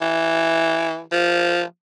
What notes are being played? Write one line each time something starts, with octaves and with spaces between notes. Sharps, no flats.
E3
F3